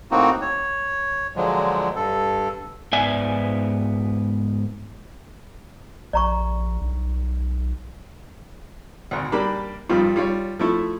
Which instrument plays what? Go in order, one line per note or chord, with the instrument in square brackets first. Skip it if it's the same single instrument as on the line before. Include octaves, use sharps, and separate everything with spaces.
[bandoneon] A2 A#3 C4 D#4 F#4
C#5
A#2 D3 F3 F#3 G#3
G2 A4
[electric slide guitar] G#2 B3 D5 E5 G#5
[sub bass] A#1 [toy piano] D5 A#5 C#6
[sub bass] B1
[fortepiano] G#1 D2
G3 A#3 D4 G4 B5 D6
G2 D#3 F3 G3 F4
G3 F4 C#5
F3 A3 E4